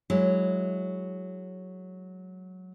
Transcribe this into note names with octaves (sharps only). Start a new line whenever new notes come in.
F#3 G#3 E4